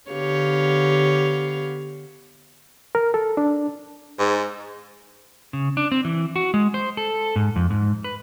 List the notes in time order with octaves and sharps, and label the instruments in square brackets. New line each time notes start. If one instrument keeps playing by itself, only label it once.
[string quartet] D3 B3 G4 C#5 F5
[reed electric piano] A#4
A4
D4
[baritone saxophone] G#2
[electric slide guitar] C#3
D4
C4
E3
F#4
G#3
C5
A4
G#2
F2
G#2
B4